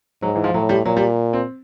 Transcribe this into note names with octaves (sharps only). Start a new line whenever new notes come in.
G#2 F#3
E3
F3
A2 F#3
G3
A#2 F#3
G3
C4